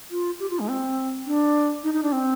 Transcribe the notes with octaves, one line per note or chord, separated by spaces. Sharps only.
F4
G4
F4
G#3
C4
D4
D#4
D#4
D4
C4